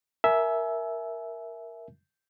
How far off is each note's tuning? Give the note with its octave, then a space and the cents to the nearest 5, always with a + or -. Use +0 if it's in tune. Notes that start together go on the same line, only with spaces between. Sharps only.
A#4 +5 E5 +0 G#5 +30